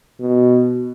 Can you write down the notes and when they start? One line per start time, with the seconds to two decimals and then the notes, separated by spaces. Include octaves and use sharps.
0.20 B2